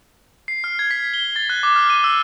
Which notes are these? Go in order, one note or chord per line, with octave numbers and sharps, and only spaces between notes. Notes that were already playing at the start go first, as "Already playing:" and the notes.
C7
F6
G#6
B6
G7
A6
F#6
D6
F6
D#7
E6